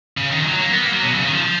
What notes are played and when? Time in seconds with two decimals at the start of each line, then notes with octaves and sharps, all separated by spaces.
0.17 C#3
0.31 D#3
0.40 F3
0.46 F#3
0.60 A#3
0.71 B3
0.81 A#3
0.92 F#3
1.03 B2
1.14 C#3
1.25 D#3
1.35 F3